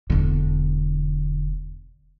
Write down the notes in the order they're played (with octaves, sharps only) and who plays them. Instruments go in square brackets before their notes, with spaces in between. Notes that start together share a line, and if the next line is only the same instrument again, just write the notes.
[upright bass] E1 D3